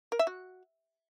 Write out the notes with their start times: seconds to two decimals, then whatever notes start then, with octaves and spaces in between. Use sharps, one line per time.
0.12 A#4
0.19 E5
0.27 F#4